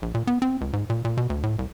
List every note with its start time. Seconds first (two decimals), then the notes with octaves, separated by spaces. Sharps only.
0.02 A#1
0.14 A#2
0.27 B3
0.42 C4
0.61 C#2
0.73 G#2
0.90 A#2
1.05 A#2
1.17 B2
1.30 D2
1.43 A2
1.59 C2